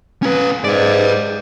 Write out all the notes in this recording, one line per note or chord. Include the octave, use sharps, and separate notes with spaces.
C#4 B4
G#2 B4 D5